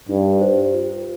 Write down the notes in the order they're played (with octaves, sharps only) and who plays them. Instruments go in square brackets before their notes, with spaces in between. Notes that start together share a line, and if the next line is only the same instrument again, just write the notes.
[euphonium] G2 [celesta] D#4
[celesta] G4 C5
F4